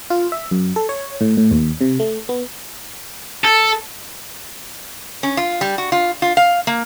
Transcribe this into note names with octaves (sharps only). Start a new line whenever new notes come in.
F4
E5
F#2
A4
C#5
A2
A2
D#2
C3
A3
B3
A4
C#4
F4
G3
F#4
F4
F4
F5
A#3